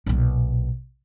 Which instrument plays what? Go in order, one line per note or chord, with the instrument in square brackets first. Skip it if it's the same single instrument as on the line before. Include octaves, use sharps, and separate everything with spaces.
[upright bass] B1 A#2